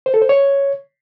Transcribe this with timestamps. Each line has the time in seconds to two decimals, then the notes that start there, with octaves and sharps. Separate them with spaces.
0.06 C5
0.14 A4
0.22 C5
0.29 C#5